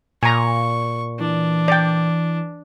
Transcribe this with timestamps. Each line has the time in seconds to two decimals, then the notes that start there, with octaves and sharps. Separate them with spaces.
0.23 A#2 G#5 A#5 C#6
1.20 E3 D4
1.68 D5 G5